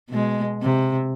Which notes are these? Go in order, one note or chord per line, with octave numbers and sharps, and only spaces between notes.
B2 G#3
C3